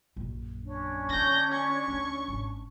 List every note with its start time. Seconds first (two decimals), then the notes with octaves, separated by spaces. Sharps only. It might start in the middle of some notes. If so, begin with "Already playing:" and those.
0.16 A#1 F#2
0.64 C#4 D4
1.09 D3 G6 A#6
1.51 C#6
1.88 D2
2.28 G#1